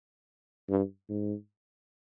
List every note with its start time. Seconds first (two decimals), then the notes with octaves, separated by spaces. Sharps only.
0.69 G2
1.09 G#2